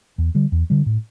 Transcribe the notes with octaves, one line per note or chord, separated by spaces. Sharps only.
E2
D3 G3
E2
D3 G3
A2